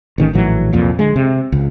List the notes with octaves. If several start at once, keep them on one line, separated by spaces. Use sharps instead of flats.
A1 D#3 F3 C#4
A#1 A2 E3 F#3
C2 F2 A#2 F3
D3 G#3
C3
C#2